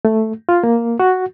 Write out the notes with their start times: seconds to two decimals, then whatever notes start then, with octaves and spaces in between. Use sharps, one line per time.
0.05 A3
0.49 F4
0.64 A#3
1.00 F#4